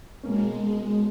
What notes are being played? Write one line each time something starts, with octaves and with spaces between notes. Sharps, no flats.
B2 G#3 A#3 C#4